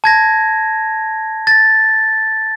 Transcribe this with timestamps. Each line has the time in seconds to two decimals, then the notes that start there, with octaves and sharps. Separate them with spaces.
0.04 A5 G#6 A#6
1.47 A6 A#6